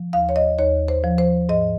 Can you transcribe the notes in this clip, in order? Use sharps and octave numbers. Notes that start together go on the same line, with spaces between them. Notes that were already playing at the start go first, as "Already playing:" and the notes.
Already playing: F3
D#2 F5
C#5
D#5
D#2 C#5
C5
F3
C5
G#2 D#5